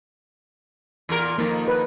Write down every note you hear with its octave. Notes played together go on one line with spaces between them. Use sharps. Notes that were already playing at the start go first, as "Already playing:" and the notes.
E2 A#2 A#4
F2 D#3 A#3
B4